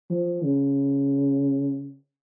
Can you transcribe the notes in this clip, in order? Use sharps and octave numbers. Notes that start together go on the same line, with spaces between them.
F3
C#3